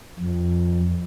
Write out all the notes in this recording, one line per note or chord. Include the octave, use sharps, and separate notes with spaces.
F2